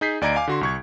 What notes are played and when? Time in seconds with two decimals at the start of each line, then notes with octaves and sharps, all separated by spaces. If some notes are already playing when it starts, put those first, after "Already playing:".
0.01 D#4 G#4 G6 B6 C7
0.21 D2 D5 D#5 A#5 G#6 D7
0.36 F5 G#5 D6
0.48 D3 F#4 C6
0.61 C2 C#6 G#6